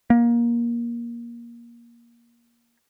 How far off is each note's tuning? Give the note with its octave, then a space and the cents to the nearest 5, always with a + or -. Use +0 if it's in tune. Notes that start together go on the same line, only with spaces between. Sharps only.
A#3 +20